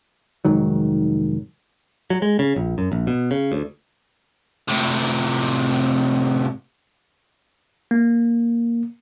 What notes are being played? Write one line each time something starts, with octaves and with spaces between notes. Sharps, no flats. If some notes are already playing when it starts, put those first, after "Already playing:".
F1 G#2 D#3 F#3
F#3
G#3
C#3
A#1
F#2
A#1
B2
C#3
D2
A2 C3
A#3